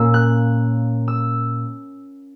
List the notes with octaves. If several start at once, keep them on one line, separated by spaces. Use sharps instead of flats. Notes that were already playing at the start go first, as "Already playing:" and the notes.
Already playing: A#2 A#3 C#4 E6
F#6
E6